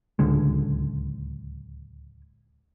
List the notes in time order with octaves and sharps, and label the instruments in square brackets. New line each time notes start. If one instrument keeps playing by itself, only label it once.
[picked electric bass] D1 C#2 D3 G#3